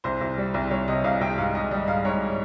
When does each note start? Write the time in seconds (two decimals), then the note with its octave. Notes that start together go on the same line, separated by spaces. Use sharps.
0.04 C2 C5
0.21 C2
0.38 G3
0.54 C2
0.71 C2 C#5
0.88 C3 D#5
1.04 C2 F5
1.21 C2 G5
1.38 G#2 F5
1.55 G#2 D#5
1.71 G3 D#5
1.87 G#2 F5
2.05 G#2 C#5